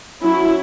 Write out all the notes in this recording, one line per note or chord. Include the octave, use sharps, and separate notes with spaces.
F#3 C#4 E4